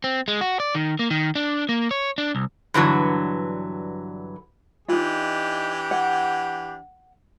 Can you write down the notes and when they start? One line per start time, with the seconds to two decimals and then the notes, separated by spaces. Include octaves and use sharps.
0.04 C4
0.28 G#3
0.41 F#4
0.60 D5
0.75 D#3
0.99 A#3
1.11 D#3
1.35 D4
1.69 A#3
1.91 C#5
2.18 D4
2.35 C2
2.74 G2 D3 E3 F#3
4.88 E3 D4 D#4 F4 G4
5.91 F#5